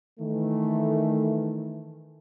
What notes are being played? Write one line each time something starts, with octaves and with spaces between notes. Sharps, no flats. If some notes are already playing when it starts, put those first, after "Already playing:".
D#3 E3 A3